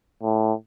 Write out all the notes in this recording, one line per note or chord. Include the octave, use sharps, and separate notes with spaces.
A2